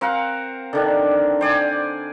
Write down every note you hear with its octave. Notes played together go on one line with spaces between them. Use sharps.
C4 A#4 F5 F#5
D3 D#3 D4
C5 D5 G#5